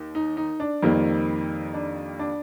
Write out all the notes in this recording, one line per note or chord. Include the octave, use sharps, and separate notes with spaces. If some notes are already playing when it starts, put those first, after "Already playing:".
Already playing: D#2
D#4
D#4
D4
F2 D#3 G3 A#3 C4
D4
D4